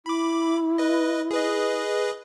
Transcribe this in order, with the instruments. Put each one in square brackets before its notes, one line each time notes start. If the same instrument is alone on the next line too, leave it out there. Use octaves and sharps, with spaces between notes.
[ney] E4 [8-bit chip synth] B5 D6
[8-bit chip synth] B4 D#5
G#4 B4 D#5